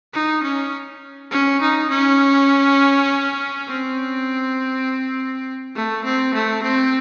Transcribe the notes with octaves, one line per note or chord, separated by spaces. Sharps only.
D#4
C#4
C#4
D#4
C#4
C4
A3
C4
A3
C4